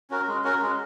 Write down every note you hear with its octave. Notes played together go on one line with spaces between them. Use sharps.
C#4 F#4 A#4
G#3
C#4 F#4 A#4
G#3